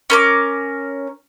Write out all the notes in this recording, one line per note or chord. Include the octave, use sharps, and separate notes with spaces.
C#4 A#4 D6